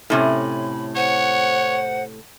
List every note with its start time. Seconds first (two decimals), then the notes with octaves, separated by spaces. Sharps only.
0.10 A2 C3 C#4 B5
0.96 C5 C#5 F#5